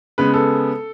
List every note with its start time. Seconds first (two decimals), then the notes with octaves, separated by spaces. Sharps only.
0.18 C#3 G#3 B3 B4
0.34 A4